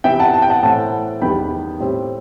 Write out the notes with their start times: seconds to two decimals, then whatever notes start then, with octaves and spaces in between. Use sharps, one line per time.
0.04 C3 E3 B3 E5 G5
0.20 F#5 A5
0.34 A5
0.42 G5
0.50 F#5 A5
0.63 A2 E3 A3 C4 F#5 A5
1.22 E2 D#3 G3 B3 G5 B5
1.80 A2 G3 C4